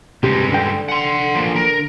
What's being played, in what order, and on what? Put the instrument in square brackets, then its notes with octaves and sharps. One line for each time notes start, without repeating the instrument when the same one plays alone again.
[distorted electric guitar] G2 G#3 [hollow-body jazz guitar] C3 G4
[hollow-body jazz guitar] D3 G5
[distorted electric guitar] F#5 C6
F3 A#3
A#4